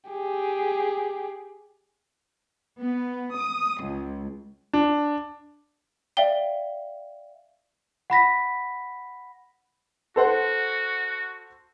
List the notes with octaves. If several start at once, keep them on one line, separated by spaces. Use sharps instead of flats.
G4 G#4
B3
D#6
C#2
D4
D5 E5 F5 G5 G7
F#5 B5 A#6 B6
F#4 A4 C5 F#5